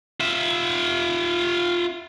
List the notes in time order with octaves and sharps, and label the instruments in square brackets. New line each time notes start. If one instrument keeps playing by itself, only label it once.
[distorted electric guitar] F4 E5